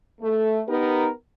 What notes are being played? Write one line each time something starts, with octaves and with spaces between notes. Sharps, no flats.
A3
B3 D#4 G4 A#4